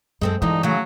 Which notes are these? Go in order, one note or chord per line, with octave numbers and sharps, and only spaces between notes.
F#2 G#3 C4 A4
G2 D3 E3 G#3 D#4
C#3 F#3 A3